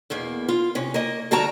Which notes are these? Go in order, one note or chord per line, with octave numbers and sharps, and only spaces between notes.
E2 B2 A#3
F4
C3 C#4
A#3 D#5
D2 G3 F#4 G5 A5 A#5